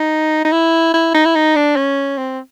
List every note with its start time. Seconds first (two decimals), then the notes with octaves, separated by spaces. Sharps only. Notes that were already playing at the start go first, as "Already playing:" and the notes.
Already playing: D#4
0.45 D#4
0.52 E4
0.94 E4
1.14 D#4
1.25 E4
1.35 D#4
1.56 D4
1.76 C#4
2.17 C4